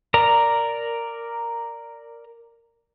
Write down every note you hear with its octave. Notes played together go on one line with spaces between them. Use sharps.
A#4 D5 A#5